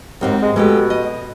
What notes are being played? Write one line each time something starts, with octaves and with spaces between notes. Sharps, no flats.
D#2 G#2 C4 F#4
G#3
B2 G#3 A3 G4
D#5